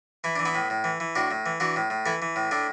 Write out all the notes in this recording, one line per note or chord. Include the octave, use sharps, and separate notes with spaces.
E3 E4
E3 D4
B3 E4
A2
A2
E3
E3
A2 D4 F#4
A2
E3
E3 D4 F#4
A2
A2
E3 E4 A4
E3
A2
A2 A3 D4